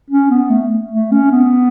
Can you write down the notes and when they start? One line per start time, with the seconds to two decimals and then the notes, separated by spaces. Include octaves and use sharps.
0.10 C#4
0.30 B3
0.50 A3
0.91 A3
1.12 C#4
1.31 B3